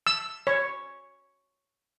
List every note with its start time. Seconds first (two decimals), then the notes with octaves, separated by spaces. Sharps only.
0.07 E6
0.47 C#5